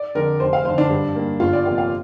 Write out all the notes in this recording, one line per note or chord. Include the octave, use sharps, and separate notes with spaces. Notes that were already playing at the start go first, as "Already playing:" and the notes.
Already playing: D5
F2 D3 A#4
F1 C5
F5
F2 D3 C5
D4
G2
G3 A#3
G1 F4
D5
F2 C3 A#3 F5
F5